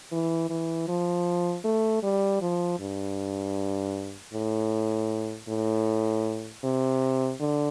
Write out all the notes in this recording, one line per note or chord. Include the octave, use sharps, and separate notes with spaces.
E3
E3
F3
A3
G3
F3
G2
A2
A2
C3
D3